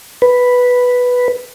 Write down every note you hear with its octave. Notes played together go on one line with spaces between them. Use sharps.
B4